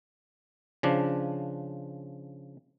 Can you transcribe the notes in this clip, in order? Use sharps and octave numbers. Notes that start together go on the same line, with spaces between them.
C#3 F3 D4